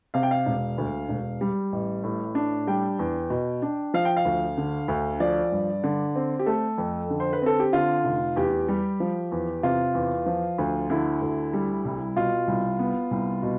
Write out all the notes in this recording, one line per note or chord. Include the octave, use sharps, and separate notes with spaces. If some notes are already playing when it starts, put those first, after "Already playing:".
C3 F5
G5
F5
E1
D2
E1
G3
A1
A2
D4
G3 G5
E2
B2
D4
F3 F5
G5
F5
D2
D3
D2
F3 D5
G2
D3
C4
G4
A3 A4
F2
D3
C5
B4
C4 A4
G4
D3 F4
F1
E2 G4
G3
F3
E2
C3 F4
E2
F3
D2
D3 E4
D2
G3
C2
B2 F4
C2
B3
C2
B2